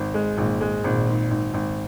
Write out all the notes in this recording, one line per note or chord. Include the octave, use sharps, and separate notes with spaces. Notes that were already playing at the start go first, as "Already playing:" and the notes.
Already playing: G#1
G#3
G#1 A#2
G#3
G#1 A#2
G#2
G#1
G#1